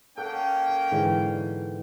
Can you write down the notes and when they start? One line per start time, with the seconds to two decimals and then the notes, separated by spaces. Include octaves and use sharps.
0.18 A#3 C#4 A4 F#5 G5
0.92 G#2 D3 E3